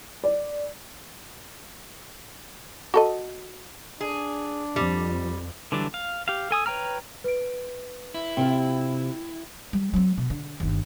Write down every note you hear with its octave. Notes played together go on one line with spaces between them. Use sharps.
D5
F#4 A4 D#5
D4 G#4
F2 G3
D3 E3 F#3 G3 D4
F5
G4 F5
A4 G#5 D#6 E6
B4 C#5 G5 A#5 F6
B4 D7
E4
C3 C4 F4 G5
G3
F#3 C4
B2
D3
G1 D#2